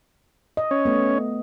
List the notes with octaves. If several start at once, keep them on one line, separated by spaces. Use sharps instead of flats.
D#5
C#4 C#5
A3 B3